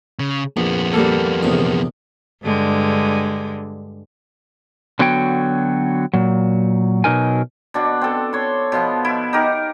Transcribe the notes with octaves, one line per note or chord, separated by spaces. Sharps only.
C#3
A#1 F2 B3
G3 A#3 A4
A#1 E2 C3
G2 D3 G#3
D3 F#3 B3 F#4 C#5 G5
A#2 F#3
B2 F#3 D#4 A#4 G#5
B2 D4 F#4
C4 A4
C#5 C6
B2 F3 B3
E4
D#4 G4 A#4